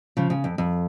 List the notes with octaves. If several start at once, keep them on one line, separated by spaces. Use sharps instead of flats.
C#3 F3
C#3
F2
F2